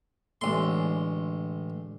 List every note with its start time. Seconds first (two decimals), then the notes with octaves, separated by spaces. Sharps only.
0.41 A1 A2 D3 G#3 C6